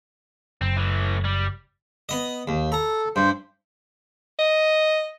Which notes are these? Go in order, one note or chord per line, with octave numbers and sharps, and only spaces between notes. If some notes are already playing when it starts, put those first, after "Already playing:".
F#1 C4
A2 E3
G3
B3 D#5
D#2
A4 A#5
G2 C5
D#5